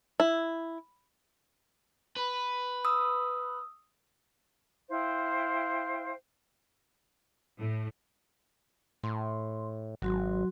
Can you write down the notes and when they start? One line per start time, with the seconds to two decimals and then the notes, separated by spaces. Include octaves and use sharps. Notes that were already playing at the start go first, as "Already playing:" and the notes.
0.20 E4
2.16 B4
2.85 D#6 E6
4.90 E4 C5 F5 G5
7.59 A2
9.03 A2 C6
10.02 G#1 F#3 F#4 C6